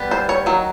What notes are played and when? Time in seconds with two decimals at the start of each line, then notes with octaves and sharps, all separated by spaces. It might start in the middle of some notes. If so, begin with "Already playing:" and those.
Already playing: G3 B3
0.11 C5
0.29 C#5
0.46 D#3 F#3